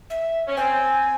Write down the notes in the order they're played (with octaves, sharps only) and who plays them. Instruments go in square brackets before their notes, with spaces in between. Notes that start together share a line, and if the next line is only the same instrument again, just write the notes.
[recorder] E5
[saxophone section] C#4
[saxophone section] C4 [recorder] G#5